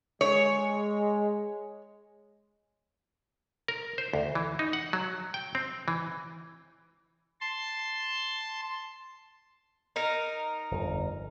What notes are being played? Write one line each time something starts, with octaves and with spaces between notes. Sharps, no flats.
G#3 C#5
A#4
C5
D2
E3
D#4
F#5
F#3
G5
C4
E3
A5 C6
D#4 A#4
G1 F2